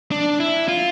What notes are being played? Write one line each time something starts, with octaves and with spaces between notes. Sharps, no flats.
D4
E4
F4